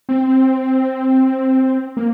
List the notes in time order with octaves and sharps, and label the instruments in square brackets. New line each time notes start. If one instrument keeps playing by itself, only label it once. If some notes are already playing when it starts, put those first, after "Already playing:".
[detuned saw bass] C4
A#3